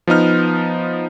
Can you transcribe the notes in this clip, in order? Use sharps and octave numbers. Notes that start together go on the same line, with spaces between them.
F3 B3 D#4 F6